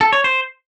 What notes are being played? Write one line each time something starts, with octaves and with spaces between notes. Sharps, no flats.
A4
C#5
C5